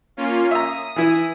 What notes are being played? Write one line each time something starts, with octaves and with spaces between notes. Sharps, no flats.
A#3 C#4 F4
E5 A#5 D#6
E3 E4